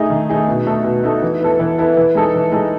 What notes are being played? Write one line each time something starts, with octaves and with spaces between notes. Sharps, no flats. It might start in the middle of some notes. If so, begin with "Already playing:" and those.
Already playing: A3 D#4 G#4
D#3
A3 D#4 G#4
B2
A3 D#4 A4
B2
A3 D#4 A4
E3
B3 E4 A4
E3
B3 E4 A4
E3
G#3 D#4 A4
E3
G#3 D#4 A4